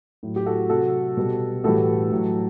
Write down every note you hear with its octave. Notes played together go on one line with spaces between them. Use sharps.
A2 F#3
G4
F#4 A4
C3 F#3 F#4 A4
B2 G3
A2 E3 G3 F#4 A4
A2 F#3